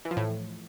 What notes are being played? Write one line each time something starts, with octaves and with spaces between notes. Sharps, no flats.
E3
F3
A2